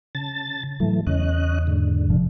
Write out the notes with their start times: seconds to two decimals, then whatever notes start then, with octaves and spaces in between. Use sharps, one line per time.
0.15 C#3 A5 A6
0.80 A2 E3 F#3 A3
1.07 E2 C#3 C#4 D#5 F#6
1.67 G#2 D3
2.08 F1 C3 F3